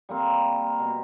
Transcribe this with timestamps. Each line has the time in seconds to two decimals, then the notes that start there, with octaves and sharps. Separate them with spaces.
0.09 G3 A#3 C4
0.79 B2